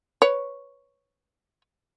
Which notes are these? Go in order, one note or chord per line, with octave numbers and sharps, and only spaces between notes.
B4 C#5